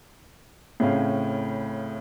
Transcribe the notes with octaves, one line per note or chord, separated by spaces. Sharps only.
A2 C#3 C4 C#4 F5